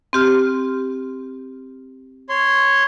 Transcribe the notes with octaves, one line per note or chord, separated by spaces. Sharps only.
C4 G4 F6
C#5 C6